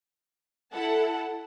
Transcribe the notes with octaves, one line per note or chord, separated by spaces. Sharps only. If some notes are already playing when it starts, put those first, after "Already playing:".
E4 A4 F#5 A5